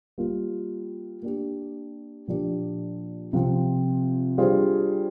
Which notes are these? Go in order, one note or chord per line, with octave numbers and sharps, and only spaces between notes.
G3 A#3 F4
A#3 D4 G4
A#2 F3 A#3 D4 G4
C3 F3 C4
G3 D4 F4 G#4 C5